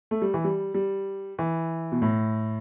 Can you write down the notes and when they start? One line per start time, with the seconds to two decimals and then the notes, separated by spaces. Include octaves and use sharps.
0.11 A3
0.22 G3
0.34 E3
0.44 G3
0.74 G3
1.39 E3
1.92 B2
2.02 A2